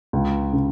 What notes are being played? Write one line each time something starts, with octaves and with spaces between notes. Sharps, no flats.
C#2
C#3